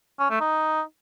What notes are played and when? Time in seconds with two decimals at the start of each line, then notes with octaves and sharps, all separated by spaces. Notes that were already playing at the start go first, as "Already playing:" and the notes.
0.19 C#4
0.30 A3
0.40 D#4